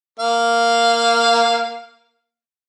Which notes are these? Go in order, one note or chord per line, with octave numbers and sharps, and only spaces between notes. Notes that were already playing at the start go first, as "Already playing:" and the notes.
A#3 F5